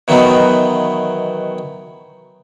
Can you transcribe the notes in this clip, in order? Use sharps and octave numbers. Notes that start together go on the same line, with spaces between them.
B2 D#3 E3 F#3 A3 B3